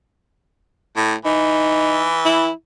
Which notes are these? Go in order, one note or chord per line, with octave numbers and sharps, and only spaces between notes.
A2
E3 D#4
E4